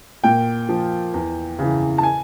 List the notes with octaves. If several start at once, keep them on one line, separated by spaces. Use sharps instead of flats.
A#2 G5
F3
E2
C#3 E3
A5
G#5